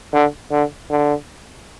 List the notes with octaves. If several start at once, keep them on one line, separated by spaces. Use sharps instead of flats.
D3
D3
D3